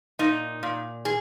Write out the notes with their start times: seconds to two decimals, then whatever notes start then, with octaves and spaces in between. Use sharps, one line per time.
0.19 A#2 D#4
0.63 A#2
1.05 G#4